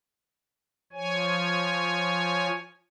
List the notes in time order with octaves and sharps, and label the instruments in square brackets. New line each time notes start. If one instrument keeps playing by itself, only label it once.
[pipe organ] F3 C#5 G#5